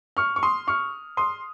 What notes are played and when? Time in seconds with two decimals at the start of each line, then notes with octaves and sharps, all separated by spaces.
0.17 C#6 F6
0.36 C#6
0.43 C6 D#6
0.68 C#6 F6
1.17 C6 D#6